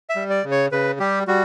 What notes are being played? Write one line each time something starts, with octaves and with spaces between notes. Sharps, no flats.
E5
G3
D5
C#3
C#5
C#3 B4
G3 G4
G3 F#4